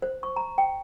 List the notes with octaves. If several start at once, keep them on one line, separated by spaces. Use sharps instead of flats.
C5
C#6
A#5
G5